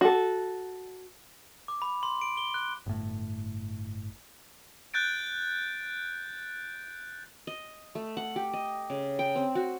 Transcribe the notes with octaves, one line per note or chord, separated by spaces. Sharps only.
F#4 A4
D6
B5
C6
D7
G7
F#6
G1 A2
F#6 G6 A6 D7
D#5
A3
F#5
G4
D#5
C#3
G5
C4
F#4